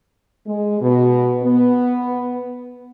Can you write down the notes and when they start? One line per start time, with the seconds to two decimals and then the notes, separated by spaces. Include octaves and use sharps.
0.47 G#3
0.81 B2
1.42 B3